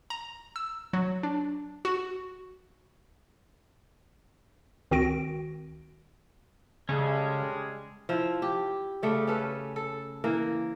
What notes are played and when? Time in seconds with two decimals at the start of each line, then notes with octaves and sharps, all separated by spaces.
0.10 A#5
0.56 E6
0.93 F#3
1.23 D4
1.85 F#4
4.91 C#2 D#3 C4 F#4 A#6 D7
6.89 C#3 G3 G#3 C#4 G#4 A4
8.09 F3 E4
8.42 G4
9.03 C#3 A3 D5
9.27 C#4 A4 B4
9.76 A4
10.24 E3 A#3 A#4